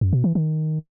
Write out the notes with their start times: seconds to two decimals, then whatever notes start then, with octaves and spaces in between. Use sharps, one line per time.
0.01 F#2
0.13 B2
0.24 E3
0.35 D#3